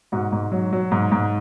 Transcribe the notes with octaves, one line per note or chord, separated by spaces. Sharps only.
G#2 F#4
G#2
F#3
F#3
G#2
G#2